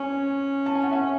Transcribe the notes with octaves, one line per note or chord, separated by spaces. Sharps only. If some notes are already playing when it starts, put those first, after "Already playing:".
Already playing: C#4 G#5
A5
G#5
F#5
E5 G#5